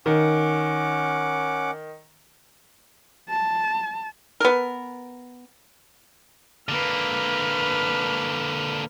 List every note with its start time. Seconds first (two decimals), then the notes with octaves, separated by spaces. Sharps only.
0.06 D#3 C#4 F#5 D6
3.29 A5
4.40 B3 A#4
6.69 D3 A#3 B4 F6